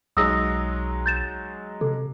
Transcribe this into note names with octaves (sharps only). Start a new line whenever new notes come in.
B1 F#3 G#3 D#4 D#6 E6 A#6
G6 A6 E7
C3 A4